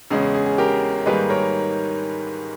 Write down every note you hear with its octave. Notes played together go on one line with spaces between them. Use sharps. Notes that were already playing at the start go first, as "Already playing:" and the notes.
E2 C#3 G#3 C#4 G#4
G#4
G#4
G#4
G4 A#4
G#2 D#3 G3 A#3 G#4 B4
A#4 C#5